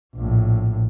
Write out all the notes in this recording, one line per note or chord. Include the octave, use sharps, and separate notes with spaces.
A#1 A2